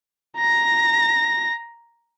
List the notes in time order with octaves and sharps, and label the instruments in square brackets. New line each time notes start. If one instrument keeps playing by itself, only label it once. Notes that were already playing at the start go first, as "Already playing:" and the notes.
[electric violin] A#5 A#6